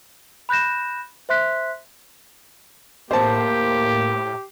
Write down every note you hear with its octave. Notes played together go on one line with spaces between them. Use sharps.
B5 F#6 G6 A#6 E7
C5 E5 C6 F#6 B6
A2 A#3 G4 C5 A5